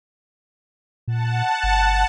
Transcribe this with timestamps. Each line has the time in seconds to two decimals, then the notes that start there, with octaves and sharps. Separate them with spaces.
1.08 A#2 F#5 A5
1.63 G1